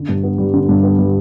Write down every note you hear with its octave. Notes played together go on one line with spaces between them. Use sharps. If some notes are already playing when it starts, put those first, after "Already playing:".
Already playing: D3
G2
B3
G3
D3
G2
B3
G3